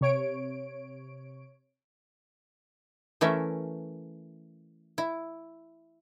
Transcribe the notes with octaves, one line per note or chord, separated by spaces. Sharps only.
C3 C#5 D7
E3 A3 C#4 A#4 E5
E4